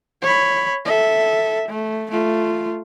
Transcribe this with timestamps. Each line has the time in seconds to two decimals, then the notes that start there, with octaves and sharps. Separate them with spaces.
0.22 C#5 B5
0.85 A4 E5
1.68 A3
2.11 A3 F4